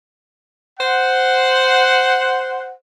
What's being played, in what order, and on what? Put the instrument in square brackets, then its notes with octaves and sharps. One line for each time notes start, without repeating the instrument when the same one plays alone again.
[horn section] C5 F#5